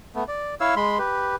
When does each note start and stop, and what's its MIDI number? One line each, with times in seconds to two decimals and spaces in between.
0.15 0.24 57
0.15 0.24 59
0.28 0.55 74
0.60 0.75 64
0.60 0.75 73
0.60 0.75 77
0.60 0.75 88
0.76 0.98 56
0.76 0.98 83
0.76 0.98 84
0.98 1.36 67
0.98 1.36 71